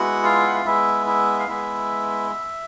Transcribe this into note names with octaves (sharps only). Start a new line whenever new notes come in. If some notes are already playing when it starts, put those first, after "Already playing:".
Already playing: G#3 B3 E4 F#4 F#5
F4 F5
F#5
F5
G#3 B3 E4 E5
E4 E5
F5
G#3 B3 E4 E5